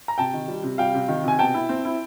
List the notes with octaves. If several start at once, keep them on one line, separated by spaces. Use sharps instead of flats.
A#5
C3 G5 A5
D#3
G3
C3
G3 F5 G5
C3
D#3
C3 G#5
B2 G5 A5
E4
C4
E4